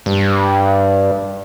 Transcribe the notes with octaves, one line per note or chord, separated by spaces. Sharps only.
G2